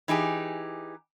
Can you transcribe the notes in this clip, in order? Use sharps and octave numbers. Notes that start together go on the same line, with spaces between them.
E3 D#4 G4 G#4